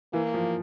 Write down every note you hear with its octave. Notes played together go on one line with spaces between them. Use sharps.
E3 A#3
F3